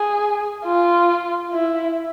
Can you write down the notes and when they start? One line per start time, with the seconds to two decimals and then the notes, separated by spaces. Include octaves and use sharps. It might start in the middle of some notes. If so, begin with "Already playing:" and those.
Already playing: G#4
0.65 F4
1.53 E4